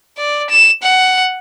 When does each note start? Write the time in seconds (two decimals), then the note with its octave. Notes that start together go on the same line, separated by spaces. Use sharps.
0.18 D5
0.50 E7
0.83 F#5